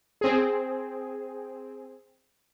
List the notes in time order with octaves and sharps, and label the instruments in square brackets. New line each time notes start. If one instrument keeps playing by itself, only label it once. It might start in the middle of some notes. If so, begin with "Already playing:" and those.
[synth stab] C4 G#4